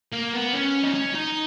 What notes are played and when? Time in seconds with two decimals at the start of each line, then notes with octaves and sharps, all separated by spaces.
0.13 A#3
0.33 B3
0.54 C#4
0.84 D#4
0.94 C#4
1.15 D#4